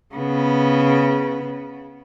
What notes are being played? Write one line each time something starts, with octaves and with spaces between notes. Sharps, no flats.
C#3 B3